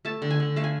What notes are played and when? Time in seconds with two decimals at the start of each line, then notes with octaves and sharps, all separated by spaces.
0.05 A3 A5
0.22 D3
0.31 G#5
0.40 D3
0.56 A3 F5
0.64 G#5